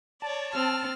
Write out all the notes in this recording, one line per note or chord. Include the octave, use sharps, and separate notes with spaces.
C#5 D5 A5
C4 F6